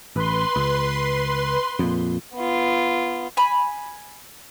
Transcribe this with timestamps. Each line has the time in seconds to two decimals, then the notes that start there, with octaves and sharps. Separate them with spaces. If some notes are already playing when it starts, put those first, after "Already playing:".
0.16 A1 B4 C6
0.56 C#2
1.79 F2 A#2
2.35 B3 F4
3.37 G#5 B5